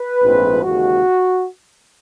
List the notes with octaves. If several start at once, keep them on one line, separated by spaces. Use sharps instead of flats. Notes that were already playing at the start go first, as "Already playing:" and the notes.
Already playing: B4
A#1 G#2 F3 A3 C4
D#2 C#3 E3 G#3 F#4